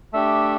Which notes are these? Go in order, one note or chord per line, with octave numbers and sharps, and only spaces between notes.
A3 D4 G4 E5